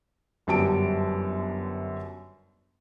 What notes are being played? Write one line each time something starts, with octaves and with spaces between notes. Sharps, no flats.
G1 F#2 G3 A5 D7